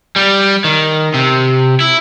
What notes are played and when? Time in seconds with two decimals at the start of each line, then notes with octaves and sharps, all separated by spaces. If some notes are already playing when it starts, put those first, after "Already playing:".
0.16 G3
0.64 D#3
1.14 C3
1.80 E4